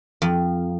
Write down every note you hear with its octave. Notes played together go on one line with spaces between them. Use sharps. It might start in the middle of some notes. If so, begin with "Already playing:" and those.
F2